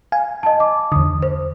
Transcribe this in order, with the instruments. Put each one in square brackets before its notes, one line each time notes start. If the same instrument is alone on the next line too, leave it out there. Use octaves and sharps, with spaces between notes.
[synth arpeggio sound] F5 G#5
[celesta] D#5 A5
D6
[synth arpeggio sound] E2 D3 [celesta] D#6
[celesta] C5